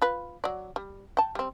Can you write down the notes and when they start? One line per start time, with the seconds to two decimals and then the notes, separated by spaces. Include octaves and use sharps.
0.02 F4 B4
0.44 F#3 D5
0.76 G3
1.17 G5 A5
1.35 G3 C4